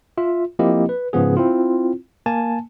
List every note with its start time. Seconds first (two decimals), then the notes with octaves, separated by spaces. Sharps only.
0.18 F4 E5
0.59 F3 A#3 C4 E4 G4 D#5
0.89 B4
1.13 G#2 C#3 F3 B3 G#4
1.37 C4 E4 F4
2.26 A#3 G#5 A5